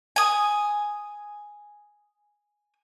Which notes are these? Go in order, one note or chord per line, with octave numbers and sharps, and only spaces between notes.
G#5 D#6